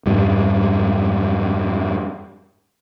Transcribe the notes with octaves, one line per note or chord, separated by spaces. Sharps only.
F2 G#2 G3